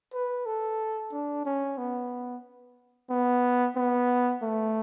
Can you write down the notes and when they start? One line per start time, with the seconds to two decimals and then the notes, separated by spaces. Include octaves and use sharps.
0.13 B4
0.46 A4
1.12 D4
1.45 C#4
1.78 B3
3.10 B3
3.76 B3
4.42 A3